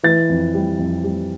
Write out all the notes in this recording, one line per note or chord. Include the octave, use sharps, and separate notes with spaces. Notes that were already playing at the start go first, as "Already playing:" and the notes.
E3 A6
F2
G3
F2
G3